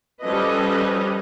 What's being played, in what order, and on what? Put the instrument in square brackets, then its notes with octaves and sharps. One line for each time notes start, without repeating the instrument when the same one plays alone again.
[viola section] F3 G3 C#4 A4 B4 D#5